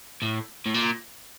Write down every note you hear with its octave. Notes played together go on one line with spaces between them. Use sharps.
A2
A2
A#2